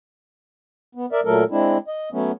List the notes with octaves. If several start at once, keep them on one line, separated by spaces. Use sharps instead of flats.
B3
A#4 D5 E5
A#2 F#3 A3 A4 A#4
G#3 C4 D4 E4
D#5
F#3 A3 B3 C#4